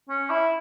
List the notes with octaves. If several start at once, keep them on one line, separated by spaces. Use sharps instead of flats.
C#4
E4